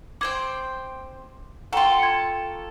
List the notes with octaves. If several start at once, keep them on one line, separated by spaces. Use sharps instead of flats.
C4 C5 G5 D6 G#6
F4 A4 F#5 G5 A#5 C6 C#6
G#6 C#7